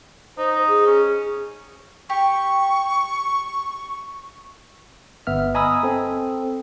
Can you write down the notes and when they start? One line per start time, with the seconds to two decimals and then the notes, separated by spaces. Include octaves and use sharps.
0.38 D#4 C5
0.68 G#4
0.86 C#4
2.09 G4 C#6
5.27 G1 B3 E5 F6
5.55 D#5 G#5 A#5 B5 D#6 E6
5.83 C4 A4